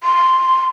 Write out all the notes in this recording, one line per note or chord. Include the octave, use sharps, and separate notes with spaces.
C6